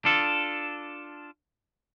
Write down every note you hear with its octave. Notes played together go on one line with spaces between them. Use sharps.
D4 F4 A4